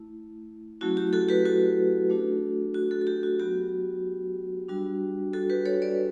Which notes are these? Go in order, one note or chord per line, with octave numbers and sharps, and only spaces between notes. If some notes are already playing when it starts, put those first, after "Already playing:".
Already playing: A3 E4
F#3 A3 C#4 E4 F#4
G4
F#4 A4
G4 B4
F#4 A4
A3 D4 F#4
F#4
F#4 A4
A4
G4
F#4
F#3 B3 F#4 G4
G3 D4 F#4
F#4 A4
G4 B4
A4 C#5
B4 D5